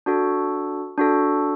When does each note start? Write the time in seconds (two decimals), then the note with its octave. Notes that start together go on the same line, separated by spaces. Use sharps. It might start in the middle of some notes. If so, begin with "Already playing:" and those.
0.06 D4 F#4 A4
0.98 D4 F#4 A4